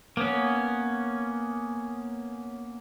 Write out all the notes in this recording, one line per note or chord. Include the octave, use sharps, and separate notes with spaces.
A#3 B3 C#4